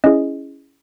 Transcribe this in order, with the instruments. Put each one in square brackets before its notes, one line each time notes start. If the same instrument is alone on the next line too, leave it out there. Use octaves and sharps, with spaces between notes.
[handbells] C#4 E4 G#4 D#5